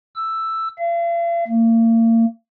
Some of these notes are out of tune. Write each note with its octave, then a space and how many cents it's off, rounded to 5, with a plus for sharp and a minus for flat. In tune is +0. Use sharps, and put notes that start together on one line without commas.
E6 +5
F5 -45
A#3 -35